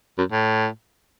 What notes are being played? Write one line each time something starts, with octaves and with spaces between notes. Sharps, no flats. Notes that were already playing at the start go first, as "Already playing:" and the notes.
F#2
A2